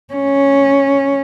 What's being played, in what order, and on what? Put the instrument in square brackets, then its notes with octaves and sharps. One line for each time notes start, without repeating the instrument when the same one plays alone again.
[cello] C#4